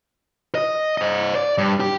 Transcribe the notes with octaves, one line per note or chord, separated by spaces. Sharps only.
D#5
C5 D#5
D5
G2
G4